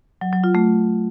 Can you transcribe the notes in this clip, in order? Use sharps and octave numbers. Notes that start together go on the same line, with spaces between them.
F#3
F#3
F4
A3